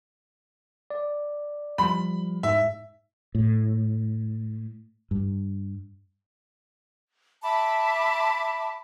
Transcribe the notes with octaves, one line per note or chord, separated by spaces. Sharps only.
D5
F3 G3 B5
G#2 E5
A2
G2
E5 A5 B5 D6